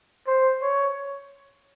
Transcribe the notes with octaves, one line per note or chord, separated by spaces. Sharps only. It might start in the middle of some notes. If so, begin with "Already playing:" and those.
C5
C#5